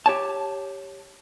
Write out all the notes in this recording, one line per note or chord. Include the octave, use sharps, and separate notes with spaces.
G4 C#5 A5